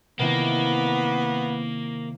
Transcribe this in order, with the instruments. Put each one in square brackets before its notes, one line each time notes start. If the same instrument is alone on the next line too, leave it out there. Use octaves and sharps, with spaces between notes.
[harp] C3 D#3 E4 [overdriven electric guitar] A#3 [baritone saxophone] B3